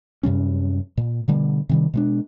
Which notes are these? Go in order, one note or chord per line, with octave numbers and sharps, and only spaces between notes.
F#2 C3 G3 C#4
A#2
B2 D3 G3
C3 D#3 G3
B2 G#3 D4